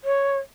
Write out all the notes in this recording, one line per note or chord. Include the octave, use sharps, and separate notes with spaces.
C#5